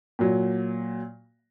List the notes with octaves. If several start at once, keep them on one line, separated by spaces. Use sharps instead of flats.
A#2 F#3